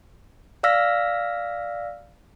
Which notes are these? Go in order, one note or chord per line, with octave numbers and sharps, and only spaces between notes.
D5 F5 E6 F6 A#6 B6